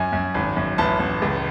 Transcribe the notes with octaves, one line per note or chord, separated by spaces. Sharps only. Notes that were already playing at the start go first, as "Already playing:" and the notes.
Already playing: F#2 G#5
F#2
G#1
F#2
A1 A5
A1
C#2